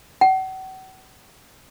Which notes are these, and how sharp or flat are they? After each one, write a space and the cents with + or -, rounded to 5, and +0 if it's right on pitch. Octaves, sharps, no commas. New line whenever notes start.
F#5 +40